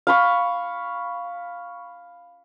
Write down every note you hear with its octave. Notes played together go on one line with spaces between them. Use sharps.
F5 B5 C#6